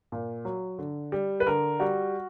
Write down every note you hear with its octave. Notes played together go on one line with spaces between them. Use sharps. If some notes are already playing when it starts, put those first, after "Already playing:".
A#2
F#3
D3
G3
B4
D3 A#4
G3 F#4